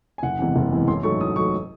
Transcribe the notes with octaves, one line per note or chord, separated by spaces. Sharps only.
G#5
F#1 F#5
E2 C3 E3 G#3
F#1
E2 C3 E3 G#3
A1 C6
G#2 F#3 A3 C#6
A1 D#6
G#2 F#3 A3 C#6